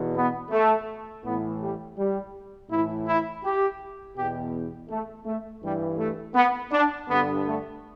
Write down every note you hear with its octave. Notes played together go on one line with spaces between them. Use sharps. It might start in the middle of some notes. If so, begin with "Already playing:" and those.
Already playing: E2 B2
B3
A3
A2 E3 B3
G3
G3
A2 E3 E4
E4
G4
E2 B2 G4
A3
A3
G2 E3 G3
A3
B3
D4
G2 D3 B3
A3